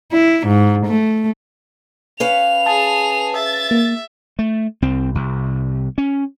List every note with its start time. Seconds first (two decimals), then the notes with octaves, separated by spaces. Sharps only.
0.12 E4
0.47 G#2
0.86 A3
2.20 C#4 B4 F5 F7
2.66 G#4 A5
3.36 E5 A6
3.71 A#3
4.39 A3
4.82 C2 C4
5.15 C2
5.98 C#4